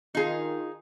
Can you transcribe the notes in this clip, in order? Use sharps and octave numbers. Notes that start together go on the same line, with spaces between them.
D#3 D#4 F4 G#4